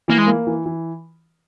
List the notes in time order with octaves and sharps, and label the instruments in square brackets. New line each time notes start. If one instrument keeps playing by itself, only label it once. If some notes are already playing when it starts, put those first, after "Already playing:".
[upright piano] E3 [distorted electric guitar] A#3
[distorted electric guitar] G#3
[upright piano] A#3
E3
E3